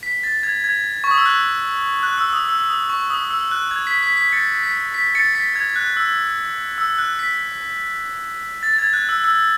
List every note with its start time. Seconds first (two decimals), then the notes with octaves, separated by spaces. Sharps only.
0.03 B6
0.23 A6
0.43 G#6
0.64 G#6
1.04 C#6
1.11 D#6
1.18 E6
1.26 F#6
2.03 F#6
2.17 E6
2.33 D#6
2.49 E6
2.69 D#6
2.89 C#6
3.10 D#6
3.30 E6
3.51 F#6
3.71 G#6
3.87 B6
4.03 B6
4.17 B6
4.32 A6 C#7
4.63 B6
4.94 B6
5.15 A6 C#7
5.35 B6
5.56 G#6
5.76 F#6
5.97 E6
6.78 E6
6.98 F#6
7.19 B6
8.63 A6
8.73 A6
8.78 G#6
8.93 F#6
9.09 E6
9.24 E6